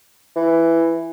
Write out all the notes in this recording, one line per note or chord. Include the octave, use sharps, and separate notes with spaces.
E3